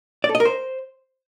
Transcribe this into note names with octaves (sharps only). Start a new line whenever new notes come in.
D5
A4
D#5
A#4
C5